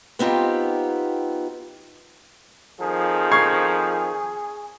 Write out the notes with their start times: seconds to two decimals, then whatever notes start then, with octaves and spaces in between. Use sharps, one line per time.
0.19 B3 C4 D#4 F4 G4
2.81 F2 D#3 F3 G#4
3.32 C#6 G#6 C7